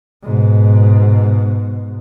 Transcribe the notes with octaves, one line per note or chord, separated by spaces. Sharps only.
G#2 B2